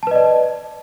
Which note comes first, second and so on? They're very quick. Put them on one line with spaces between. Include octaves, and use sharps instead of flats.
A5 B4 D#5 D5